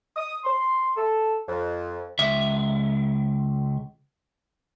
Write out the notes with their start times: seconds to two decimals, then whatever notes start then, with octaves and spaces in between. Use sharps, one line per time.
0.15 D#6
0.43 C6
0.96 A4
1.47 F2
2.19 C#2 E5